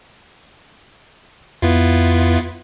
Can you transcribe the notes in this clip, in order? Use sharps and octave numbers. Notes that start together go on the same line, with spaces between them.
F2 B3 E4 F4